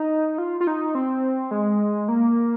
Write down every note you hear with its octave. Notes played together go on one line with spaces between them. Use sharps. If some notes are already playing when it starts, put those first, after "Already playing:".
Already playing: D#4
F4
F4
D#4
C4
G#3
A#3